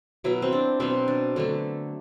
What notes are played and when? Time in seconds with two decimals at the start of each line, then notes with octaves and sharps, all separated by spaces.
0.24 B2 F#3 B3 E4
0.42 C4
0.52 D4
0.80 B2 F#3 B3 C4
1.08 D4
1.36 D3 F#3 A3